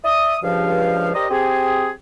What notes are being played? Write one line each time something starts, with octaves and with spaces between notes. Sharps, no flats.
D5 E5 D#6
C#2 G2 F3 F5
G4 A#4 C5 D5 D#5
C4 G4 G#4